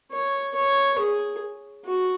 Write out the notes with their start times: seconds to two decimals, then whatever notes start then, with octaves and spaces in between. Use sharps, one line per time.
0.12 C#5
0.55 C#5
0.99 G#4
1.85 F#4